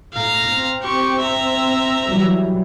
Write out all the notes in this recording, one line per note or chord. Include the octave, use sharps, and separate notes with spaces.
A2 F5 A#5
C4
G4 C#6
E5 A#5
E3 F#3 G3